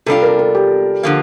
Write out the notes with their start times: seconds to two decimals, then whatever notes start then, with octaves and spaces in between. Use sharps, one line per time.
0.06 C3 G3 D4 F4 A4
0.22 A#4
0.39 A4
0.55 G4
1.03 D3 F3 A#3